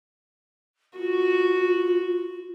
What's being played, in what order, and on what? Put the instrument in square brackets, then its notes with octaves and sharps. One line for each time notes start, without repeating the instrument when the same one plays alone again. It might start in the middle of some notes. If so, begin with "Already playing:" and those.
[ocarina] F4 [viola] F#4